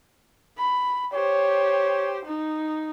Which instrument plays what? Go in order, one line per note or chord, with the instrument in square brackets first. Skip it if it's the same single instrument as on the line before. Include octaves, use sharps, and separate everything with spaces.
[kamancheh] B5
[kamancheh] G4 C5 [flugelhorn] C#5
[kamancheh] D#4